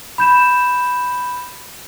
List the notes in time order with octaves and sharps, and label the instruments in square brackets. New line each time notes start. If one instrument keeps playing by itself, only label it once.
[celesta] B5 G6 E7